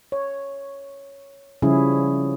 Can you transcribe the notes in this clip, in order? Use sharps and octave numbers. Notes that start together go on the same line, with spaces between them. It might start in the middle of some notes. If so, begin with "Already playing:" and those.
C#5
C#3 F3 G3 C#4 E4 G#4